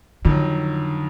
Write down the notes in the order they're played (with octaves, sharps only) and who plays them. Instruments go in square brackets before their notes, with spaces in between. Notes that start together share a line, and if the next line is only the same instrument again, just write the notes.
[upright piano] F2 D#3 F#3 [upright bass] D3